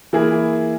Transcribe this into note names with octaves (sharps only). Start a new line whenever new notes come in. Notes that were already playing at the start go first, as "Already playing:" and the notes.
E3 A#3 E4 G#4